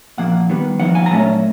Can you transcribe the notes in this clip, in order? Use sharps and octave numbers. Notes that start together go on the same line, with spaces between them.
A#2 F3 A#3 F#5
D#3 G3 B3
F3 A#3 D#4 F#5
G#5
A#5
A#2 F#3 A3 C#4 A5